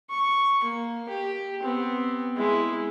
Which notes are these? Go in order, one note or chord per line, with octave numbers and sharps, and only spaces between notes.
C#6
A#3
G4
B3 C4
G#3 E4